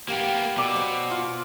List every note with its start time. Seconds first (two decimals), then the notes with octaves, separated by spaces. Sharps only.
0.08 A#3 B3 G4 F5 G5
0.57 B2 D5 D6 E6
0.76 C5 C#5
1.11 F4